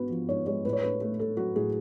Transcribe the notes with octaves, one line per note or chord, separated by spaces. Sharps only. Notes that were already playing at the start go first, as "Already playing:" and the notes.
Already playing: G#2 B3 F#4 B4
F3
G#2 C#5
G#3 C#5
A2 B4
C#5
A3 B4
A3
A3 A4
F#3 F#4
A2 G#4